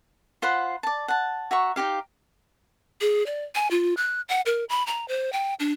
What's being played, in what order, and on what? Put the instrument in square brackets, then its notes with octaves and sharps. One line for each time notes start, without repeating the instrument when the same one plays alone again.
[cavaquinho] F4 C5 F#5 B5
D5 A5
F#5 A5
F#4 E5 A#5 C#6
D#4 E4 G4 F5
[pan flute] G#4
D5
G#5
F4
F#6
F#5
A#4
B5
A#5
C5
G5
D4